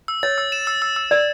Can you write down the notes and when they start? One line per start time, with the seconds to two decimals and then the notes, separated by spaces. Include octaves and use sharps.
0.08 E6
0.23 C#5 A6
0.38 E6
0.52 E7
0.67 E6
0.82 E6
0.96 E6
1.11 D5 E6